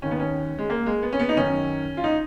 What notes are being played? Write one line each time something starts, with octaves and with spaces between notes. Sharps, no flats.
D#2 D#3 C#4
B3
C#4
G#3
A#3
G#3
B3
C#4
B3
D#4
F#2 D#3 C#4
F4
D#4